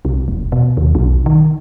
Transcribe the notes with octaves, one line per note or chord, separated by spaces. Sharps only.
C2
E1
B2
D#2
B1
D#3